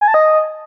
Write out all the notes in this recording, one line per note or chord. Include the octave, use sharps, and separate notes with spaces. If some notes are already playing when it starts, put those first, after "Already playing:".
G#5
A5
D#5